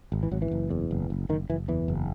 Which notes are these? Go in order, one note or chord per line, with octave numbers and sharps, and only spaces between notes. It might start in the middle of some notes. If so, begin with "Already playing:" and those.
G#1
E3
G#1 F#3
E3
F#1
E2
F#1
F#1
F#1 D#3
F#1 E3
E2 E3
F#1